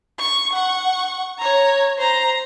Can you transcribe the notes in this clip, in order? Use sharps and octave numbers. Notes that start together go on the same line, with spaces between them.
C#6
F#5 C#6
C#5 A#5
C5 A#5